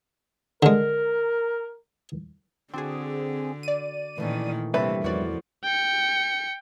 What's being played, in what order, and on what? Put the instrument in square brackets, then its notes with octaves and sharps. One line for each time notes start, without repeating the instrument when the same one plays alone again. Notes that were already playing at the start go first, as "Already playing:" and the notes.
[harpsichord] D3 G#3 [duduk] A#4
[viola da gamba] D3 [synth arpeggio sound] C4 G#4 [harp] D4 F#4
[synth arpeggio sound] D5 D#7
[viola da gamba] A#2 D#3 [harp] E3 A3 C#4
[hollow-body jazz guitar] G2 B4 E5 [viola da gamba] C3 [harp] A#3 A4 C#5
[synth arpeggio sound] E2 D5 [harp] E3 F#4 C#5 [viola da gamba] F3
[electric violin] G5 C#7